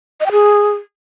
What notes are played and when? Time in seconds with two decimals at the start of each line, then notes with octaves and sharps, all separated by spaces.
0.21 D#5
0.26 G5
0.32 G#4